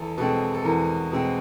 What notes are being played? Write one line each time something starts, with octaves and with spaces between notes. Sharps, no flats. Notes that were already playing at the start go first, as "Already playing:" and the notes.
Already playing: E2 A4
B2 G#3 C4 A4
A4
E2 A#4
B2 G#3 C4